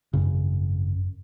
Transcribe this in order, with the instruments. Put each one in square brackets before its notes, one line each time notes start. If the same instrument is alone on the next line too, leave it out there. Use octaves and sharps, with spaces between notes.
[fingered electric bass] G#1 C#3 [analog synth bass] F#2